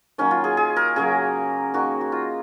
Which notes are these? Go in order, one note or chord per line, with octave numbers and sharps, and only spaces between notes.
D#3 F#3 A#3 C#4
F4
G#4
G#4
A#4
C#3 F#3 A#3 G#4
D#3 A#3 F#4
F#4
F4